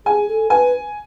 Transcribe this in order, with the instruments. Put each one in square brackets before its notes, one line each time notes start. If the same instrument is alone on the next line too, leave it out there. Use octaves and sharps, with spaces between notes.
[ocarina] G#4 [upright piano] G#5
[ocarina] A4
[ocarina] B4 [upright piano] G#5